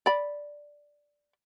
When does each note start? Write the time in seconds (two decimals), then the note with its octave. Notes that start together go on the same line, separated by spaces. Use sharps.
0.06 D5 B5